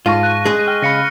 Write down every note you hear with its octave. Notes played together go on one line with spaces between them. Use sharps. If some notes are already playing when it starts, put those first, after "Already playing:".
G#2 F4 F5 A5 C#6 A#6 D#7
F#6
G#3 G#4
G5 F6
C#3 F5 B5 A#6 C#7